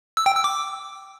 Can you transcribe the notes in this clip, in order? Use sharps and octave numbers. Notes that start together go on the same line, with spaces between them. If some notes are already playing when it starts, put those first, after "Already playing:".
E6
G5
E6
D6